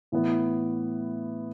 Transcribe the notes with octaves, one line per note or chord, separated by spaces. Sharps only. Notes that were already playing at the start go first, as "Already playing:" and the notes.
A2 E3 B3